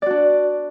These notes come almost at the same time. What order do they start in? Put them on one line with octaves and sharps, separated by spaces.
D5 F#4 D4